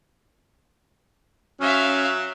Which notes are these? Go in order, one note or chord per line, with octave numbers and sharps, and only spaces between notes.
F#3 C#4 E5 F5